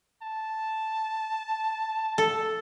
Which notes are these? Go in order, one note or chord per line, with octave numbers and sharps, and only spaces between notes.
A5
A4